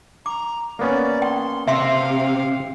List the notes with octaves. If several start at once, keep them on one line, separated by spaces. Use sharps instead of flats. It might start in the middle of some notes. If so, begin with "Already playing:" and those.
A#5 D6
A#3 B3 C#4 D5
G5 C6
C3 E5 F5 C6